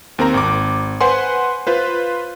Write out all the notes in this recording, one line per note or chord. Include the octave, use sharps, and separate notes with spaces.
D#2 C4 A#4 A#5
G#1 D6
B4 C5 F#5 G#5 C6
F4 B4 C5